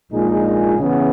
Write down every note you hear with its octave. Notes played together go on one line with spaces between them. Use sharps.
A#1 A#2 G#3 D#4 G#4
C#3 E3 B3